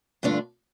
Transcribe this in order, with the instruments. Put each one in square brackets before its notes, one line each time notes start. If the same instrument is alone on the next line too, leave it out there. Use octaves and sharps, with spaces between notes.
[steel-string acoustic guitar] G2 D3 A3 D4 F4